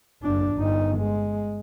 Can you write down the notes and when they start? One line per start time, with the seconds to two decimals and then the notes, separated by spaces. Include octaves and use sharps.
0.22 F#1 D4
0.55 G1 D#4
0.97 G#3